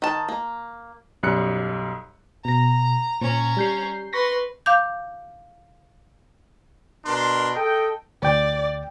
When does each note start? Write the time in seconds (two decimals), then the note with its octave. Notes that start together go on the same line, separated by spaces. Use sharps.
0.02 D#3 A5
0.28 A#3
1.23 B1 F#2 G3 F#6 C#7
2.45 B2 A#5 A#6
3.21 A#2 C#4 A#5
3.57 G3 G6 C7
4.13 B4 C6 C#6 A#6 B6
4.66 F5 D6 G6
7.05 B2 D4 A#4 C6
7.56 A4 D#5 G5
8.23 D2 D5 G5